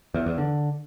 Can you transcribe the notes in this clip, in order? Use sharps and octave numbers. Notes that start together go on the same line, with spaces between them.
E2
E2
D3